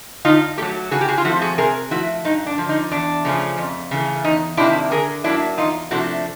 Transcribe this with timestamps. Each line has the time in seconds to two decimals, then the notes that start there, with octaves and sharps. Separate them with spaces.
0.25 D3 D#4 F4
0.58 F#3 A3 G4 A4
0.91 C#3 F#4 G#4
1.01 G4
1.08 F#4 G#4
1.18 F4
1.24 F3 A3 C4 E4 F#4
1.41 F#4 G#4
1.58 C3 G#4 A#4
1.91 F3 A3 E4 F#4
2.24 G2 D#4
2.46 D4
2.58 D3 F3
2.69 D#4
2.91 E2 D4
3.25 C#3 F3 A3 C#4
3.58 F2
3.91 C#3 E3 A3
4.24 E2 D#4
4.57 C3 D#3 G3 A#3 D4 E4
4.91 D3 G#4 A#4
5.24 F#3 A#3 D4 E4
5.58 E2 D#4 F4
5.91 C3 F3 A3 D4 E4 F#4